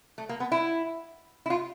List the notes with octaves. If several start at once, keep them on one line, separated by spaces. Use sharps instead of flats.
A3
A#3
B3
E4
E4
F4